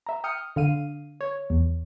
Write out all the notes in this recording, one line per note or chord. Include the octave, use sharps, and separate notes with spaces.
E5 A#5
G5 D#6 F6 C#7
D3 F5 D#7
C#5
E2